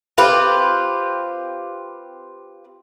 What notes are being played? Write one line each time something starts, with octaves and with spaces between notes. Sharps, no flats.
C4 F4 G4 B4